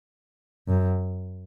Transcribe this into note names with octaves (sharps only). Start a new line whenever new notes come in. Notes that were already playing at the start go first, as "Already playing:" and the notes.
F#2